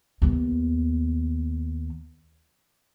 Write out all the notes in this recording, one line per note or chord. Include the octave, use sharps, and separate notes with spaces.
D#2 B3